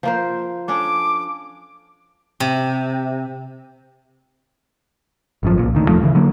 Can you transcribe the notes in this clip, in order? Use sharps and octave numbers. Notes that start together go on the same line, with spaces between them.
F3 A#3 C5
C#4 D4 A4 D6
C3
G#1 F#2 F3
B1 A#2
D2 D#3
E1 F3 A3
D2 C#3 E3
D3 F#3 A#3